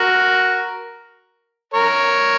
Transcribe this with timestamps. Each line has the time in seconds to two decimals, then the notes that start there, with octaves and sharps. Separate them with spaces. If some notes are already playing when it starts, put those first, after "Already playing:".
Already playing: F#4 A#4
1.73 A#4 C#5